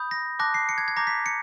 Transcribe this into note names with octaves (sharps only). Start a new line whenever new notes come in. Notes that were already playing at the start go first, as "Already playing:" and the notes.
Already playing: B5 D#6 G6
A#6
A5 D6 F#6 A#6
C7
C#7
G#6
G#6
A#5 D6 G6 A#6
B6
C#7